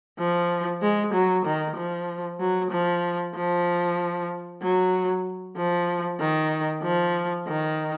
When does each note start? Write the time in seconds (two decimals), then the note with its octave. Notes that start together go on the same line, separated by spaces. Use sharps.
0.19 F3
0.82 G#3
1.14 F#3
1.45 D#3
1.77 F3
2.40 F#3
2.72 F3
3.36 F3
4.63 F#3
5.57 F3
6.20 D#3
6.83 F3
7.48 D#3